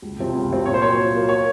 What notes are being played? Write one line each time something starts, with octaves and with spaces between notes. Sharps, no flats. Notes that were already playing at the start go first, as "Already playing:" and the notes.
C#2
C3 F3 C4
C#2
C3 F3 C4
A#2 C#5
C5
F#3 A#3 C#5
A#2
F#3 A#3
C#5